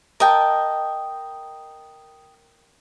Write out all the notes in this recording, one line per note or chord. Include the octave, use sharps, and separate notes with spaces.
A#4 D#5 G5 A5